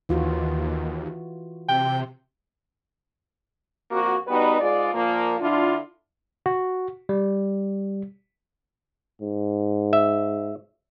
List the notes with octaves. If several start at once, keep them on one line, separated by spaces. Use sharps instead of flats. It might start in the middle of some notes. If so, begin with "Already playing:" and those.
D#2 E3 F4 F#4
C3 G5
F2 A#3 F#4
G3 B3 D#4 F#4 B4
G#2 G#3 F4 D5
A#2 F3 A#3
D3 D4 E4 F4
F#4
G3
G#2
E5